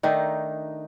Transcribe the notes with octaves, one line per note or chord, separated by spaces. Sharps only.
D#3 A3 D4 D#4